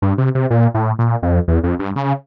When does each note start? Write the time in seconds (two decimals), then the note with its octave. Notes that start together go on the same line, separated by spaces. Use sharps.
0.02 G2
0.18 C3
0.35 C3
0.50 A#2
0.74 A2
0.99 A#2
1.23 F2
1.48 E2
1.63 F2
1.79 G2
1.96 C#3